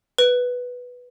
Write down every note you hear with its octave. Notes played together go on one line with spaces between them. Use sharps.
B4